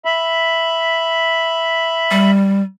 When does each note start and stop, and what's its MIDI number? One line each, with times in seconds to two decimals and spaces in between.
0.05 2.31 76
0.05 2.31 83
2.11 2.62 55